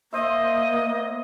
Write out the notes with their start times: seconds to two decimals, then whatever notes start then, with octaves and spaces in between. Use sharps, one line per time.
0.13 A#3 C5 D#5 E5